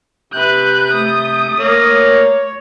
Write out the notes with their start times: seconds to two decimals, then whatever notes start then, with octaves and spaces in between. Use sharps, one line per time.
0.32 C3 B4 F#6 G6
0.92 A3 D#6
1.59 A#3 C#5